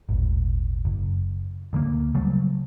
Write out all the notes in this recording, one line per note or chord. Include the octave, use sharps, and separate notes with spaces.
D#1 G#1
F#1
D2 D3 A3 A#3
C#3 F#3 G3 A3